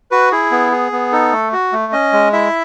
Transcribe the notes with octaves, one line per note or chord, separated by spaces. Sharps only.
F#4 B4
E4 G#4
B3
G#4
B3
D#4 A4
A3
F#4
A3
C#4 D#5
G#3
E4 E5